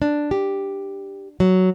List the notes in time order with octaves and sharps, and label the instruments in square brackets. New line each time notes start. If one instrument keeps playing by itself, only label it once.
[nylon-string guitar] D4
G4
F#3